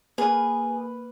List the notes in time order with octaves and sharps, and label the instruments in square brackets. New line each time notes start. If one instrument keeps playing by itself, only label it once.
[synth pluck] A#3 B4 [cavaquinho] G#4